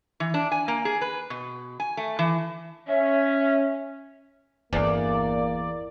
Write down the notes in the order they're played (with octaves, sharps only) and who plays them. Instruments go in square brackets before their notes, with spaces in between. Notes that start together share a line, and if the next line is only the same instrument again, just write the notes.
[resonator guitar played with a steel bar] E3
D4
G#5
A#3
G#4
B4
B2
G#5
A3
E3
[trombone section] C#4 [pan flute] E5
[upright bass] G1 D4 [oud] E2 [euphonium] A#3 [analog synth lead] D5